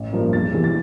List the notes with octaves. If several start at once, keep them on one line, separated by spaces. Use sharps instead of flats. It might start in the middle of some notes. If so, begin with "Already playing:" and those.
Already playing: A1
G2 F3 A#3
E1 A6
E2 C3 E3
A6